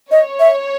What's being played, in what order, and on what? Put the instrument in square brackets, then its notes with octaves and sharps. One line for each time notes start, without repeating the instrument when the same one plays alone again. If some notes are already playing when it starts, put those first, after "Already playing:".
[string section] C#5 [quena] D#5
[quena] E5